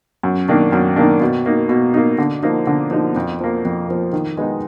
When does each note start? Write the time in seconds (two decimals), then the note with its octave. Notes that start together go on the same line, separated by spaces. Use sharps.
0.23 F#2
0.49 D#3 A#3 D4
0.72 F#2
0.96 D#3 A#3 D4
1.21 B2
1.46 A#3 D#4
1.69 B2
1.94 A#3 D#4
2.18 D3
2.43 F3 A#3 D#4
2.67 D3
2.91 F3 A#3 D#4
3.16 F2
3.41 F3 A#3
3.65 F2
3.88 F3 A#3
4.13 D#3
4.37 G#3 B3 D#4